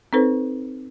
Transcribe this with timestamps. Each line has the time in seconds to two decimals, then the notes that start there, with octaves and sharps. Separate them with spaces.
0.13 C4 D#4 A4 B4 C5